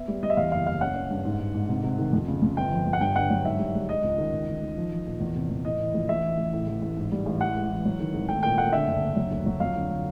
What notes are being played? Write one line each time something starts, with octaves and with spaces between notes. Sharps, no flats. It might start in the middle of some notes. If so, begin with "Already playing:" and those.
Already playing: B3 E5
G3
G3 D#5
E5
E2 F5
F#1 F5
F#1 F5
C#4 F#5
C#4
G2
G#2
G#2
G#2
C3
C3
D#3
F2
C#3
F2
G1 G5
F3
G1
F#5
G2 G5
D3 F#5
F#3
G#2 E5
G3
G3
G#3 D#5
C#2
D#3
C#2
D#3
D#3
F3
F3
A#2
E2
C3
E2
A2 D#5
E3
A#1
A1 E5
E3
A1
A2
A1
A1
G#2
G3
A1
E3 F#5
G#3
E3
F#3
D#3
G#1
A3 G5
A#2 G5
A3 F#5
D3 E5
F#1
F#1
F#3
D2
F#3
F2 F5
D3
D3